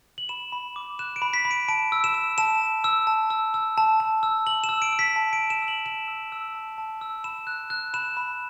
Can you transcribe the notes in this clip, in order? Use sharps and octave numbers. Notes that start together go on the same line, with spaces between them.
F#7
B5 E7
B5
D6
F#6 E7
D7
B5
B6
B5
D7
A5 D7
E6
E7
E6
A5 E7
A5
E6
A5
E6
E6
A5
A5
E6
A5 F#7
E7
E6
D7
E6
B6
A5
D7
A5
E7
E6
F#7
A5 E7
E6
E6
A5
A5
E6
B5 E7
F#6
F#6
B5 E7
B5